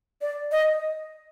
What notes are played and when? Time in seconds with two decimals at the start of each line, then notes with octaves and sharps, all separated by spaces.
0.21 D5
0.52 D#5